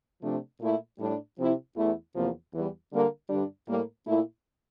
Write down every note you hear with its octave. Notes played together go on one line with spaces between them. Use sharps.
C3 F3 A3 D4
A#2 A3 E4
A2 G3 D4
C3 F3 C4 E4
E2 E3 A3 E4
E2 C3 F3 A#3
E2 E3 G3
D3 G3 A#3
G2 D3 G3 D4
A2 G3 A#3
A#2 A3 E4